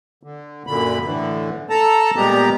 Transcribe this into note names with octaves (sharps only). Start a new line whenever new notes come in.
D3
F#2 A#2 D3 B5
A2 D3 E3
A4 A5 A#5
A#2 G3 G#3 B3 G4 A#5